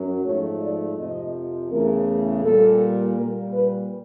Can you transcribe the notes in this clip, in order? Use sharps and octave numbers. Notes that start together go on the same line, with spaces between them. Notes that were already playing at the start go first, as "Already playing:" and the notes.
Already playing: F#2 F#3
G#2 F3 A3 C#5
D5
F2 C3 F3 D#5
E2 C#3 E3 A3 A#4
A#2 G3 A4
A#2 G3 A#4
B4